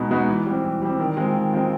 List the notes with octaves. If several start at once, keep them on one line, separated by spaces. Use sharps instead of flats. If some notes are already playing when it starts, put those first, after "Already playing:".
Already playing: B2 G#3 B3 D#4 F#4
G#3 B3 D#4 F#4
E3
G3 C4
E3
G3 C4
D#3
G#3 C4 F4
D#3
G#3 C4 F4